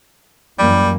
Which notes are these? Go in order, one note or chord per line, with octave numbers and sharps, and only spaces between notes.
F#2 E3 G3 A#3